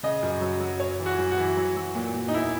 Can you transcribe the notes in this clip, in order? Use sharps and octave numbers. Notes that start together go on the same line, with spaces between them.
C#3 D#5
F#2
F#3
F#3
F#2 C#5
E3
F#4
F#2
F#4
E3
F#3
F#3
A#2
A#2
D#4
E2 E4